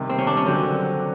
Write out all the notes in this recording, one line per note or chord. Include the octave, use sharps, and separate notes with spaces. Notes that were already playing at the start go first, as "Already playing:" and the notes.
Already playing: C3 D#3 G3
C4
C#4
D4
C#4
D3 F#3 C4